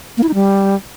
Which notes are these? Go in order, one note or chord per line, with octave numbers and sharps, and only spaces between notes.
A#3
E4
D#4
G3